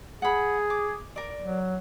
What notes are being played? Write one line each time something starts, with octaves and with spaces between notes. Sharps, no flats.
G#4 F#5 B5
D6
A#4 D5
F#3